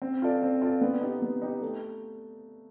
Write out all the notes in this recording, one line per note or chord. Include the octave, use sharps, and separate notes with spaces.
C4
F4 A4 D5
C4
F4 A4 D5
B3
D#4 G4
B3
D#4 G4
A3